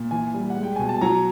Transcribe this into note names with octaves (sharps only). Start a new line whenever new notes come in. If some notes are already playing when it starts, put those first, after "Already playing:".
Already playing: A#2
E3 G#5
G3
F#5
G#3
G5
B2 G#5
A5
F#3 A#5